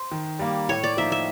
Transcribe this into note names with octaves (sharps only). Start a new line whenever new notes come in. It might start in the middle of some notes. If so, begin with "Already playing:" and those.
Already playing: C5
D#3
G3 A#3
A2 C#5
D5
F3 A#3 D#4 E5
E5